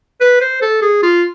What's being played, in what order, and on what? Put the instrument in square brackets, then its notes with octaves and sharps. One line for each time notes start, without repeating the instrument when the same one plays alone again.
[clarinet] B4
C5
A4
G#4
F4